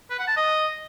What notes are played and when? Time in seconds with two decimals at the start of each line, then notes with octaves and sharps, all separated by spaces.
0.10 B4
0.19 F#5
0.28 A5
0.36 D#5